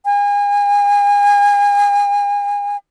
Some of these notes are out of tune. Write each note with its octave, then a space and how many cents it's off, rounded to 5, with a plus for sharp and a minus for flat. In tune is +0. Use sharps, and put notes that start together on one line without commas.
G#5 -35